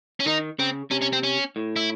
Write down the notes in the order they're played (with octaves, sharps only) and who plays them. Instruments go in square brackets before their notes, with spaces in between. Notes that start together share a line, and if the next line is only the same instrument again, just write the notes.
[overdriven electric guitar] C#4
[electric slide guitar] D#3 [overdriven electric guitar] D#4
[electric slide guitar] C#3 [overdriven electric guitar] C4
[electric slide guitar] C3 [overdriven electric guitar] C#4
[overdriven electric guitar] C#4
C4
C#4
[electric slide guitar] A2
[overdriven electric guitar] E4